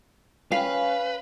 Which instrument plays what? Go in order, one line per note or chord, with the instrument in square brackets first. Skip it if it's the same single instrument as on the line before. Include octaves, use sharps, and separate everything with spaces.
[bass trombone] C#4 [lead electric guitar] B4 [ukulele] F5